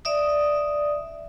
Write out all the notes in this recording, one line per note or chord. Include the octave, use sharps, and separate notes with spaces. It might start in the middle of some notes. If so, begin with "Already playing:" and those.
D5 E5 D#6